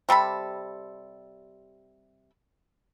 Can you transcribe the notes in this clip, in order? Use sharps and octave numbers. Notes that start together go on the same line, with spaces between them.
C3 G3 A4 B5